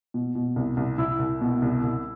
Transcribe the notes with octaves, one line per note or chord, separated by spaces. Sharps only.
B2
B2
C2
C2
C2 E4
C2
B2
C2
C2